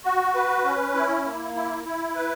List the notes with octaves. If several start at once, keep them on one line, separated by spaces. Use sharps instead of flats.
F#4
B4
C#4
E4
A#3
E4
E4
B4